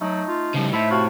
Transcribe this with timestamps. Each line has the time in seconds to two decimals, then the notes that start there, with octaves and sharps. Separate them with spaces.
0.01 F#3 A3 D#4
0.28 F4
0.55 C#3 F3 G3
0.73 A2 E4 C5 E5 A5
0.91 C3 F#4 F5 A5